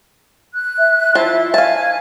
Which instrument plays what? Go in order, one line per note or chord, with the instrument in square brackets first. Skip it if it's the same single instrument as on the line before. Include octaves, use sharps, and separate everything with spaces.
[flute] F#6
[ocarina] E5
[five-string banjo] F3 A5 [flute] E4
[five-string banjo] F5 A5 [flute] G#5